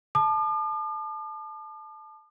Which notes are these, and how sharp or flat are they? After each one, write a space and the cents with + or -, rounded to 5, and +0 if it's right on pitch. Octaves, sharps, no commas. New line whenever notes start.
A5 -15 D6 +45